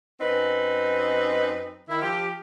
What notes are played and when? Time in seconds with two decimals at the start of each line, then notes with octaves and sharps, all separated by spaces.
0.21 F#2 C4 D#4 B4
1.89 D#3 E4
2.02 F3 G4